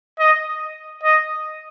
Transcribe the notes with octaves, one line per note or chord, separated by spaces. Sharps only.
D#5
D#5